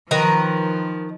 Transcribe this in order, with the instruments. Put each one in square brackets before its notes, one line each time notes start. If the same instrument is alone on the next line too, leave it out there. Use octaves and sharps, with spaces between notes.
[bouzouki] D#3 A#4 B4 [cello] F3